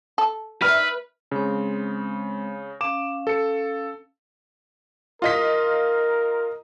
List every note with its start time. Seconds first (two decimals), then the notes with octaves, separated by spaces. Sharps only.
0.18 A4
0.62 D#4 B4 D5 E5 F6
1.31 C#3 G#3 C4 C5
2.81 C#4 F5 D6 E7
3.27 A4 C#7
5.22 F4 A#4 D#5 B6